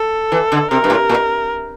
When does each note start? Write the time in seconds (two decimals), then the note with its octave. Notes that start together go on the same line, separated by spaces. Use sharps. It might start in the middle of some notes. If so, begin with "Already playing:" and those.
Already playing: A4
0.32 E3
0.52 D3
0.71 C3 A#4
0.84 G2
0.90 A2
1.09 A#2